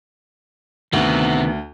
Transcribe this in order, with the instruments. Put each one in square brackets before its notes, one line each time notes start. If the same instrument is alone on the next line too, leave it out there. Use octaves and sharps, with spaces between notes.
[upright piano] D2 [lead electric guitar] C3 [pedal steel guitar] D#3 B3